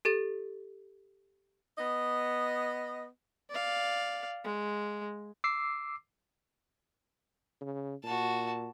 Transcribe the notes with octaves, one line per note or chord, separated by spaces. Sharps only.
G4 A4 A6 D#7
B3 D#5
D5 F5
G#3
D6 E6 C7
C#3
A#2 F#4 A5